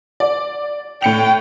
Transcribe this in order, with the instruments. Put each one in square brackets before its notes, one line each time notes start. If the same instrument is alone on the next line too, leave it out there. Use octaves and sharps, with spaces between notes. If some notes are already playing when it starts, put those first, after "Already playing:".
[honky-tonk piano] D5
[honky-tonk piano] A2 C#7 F7 [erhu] G5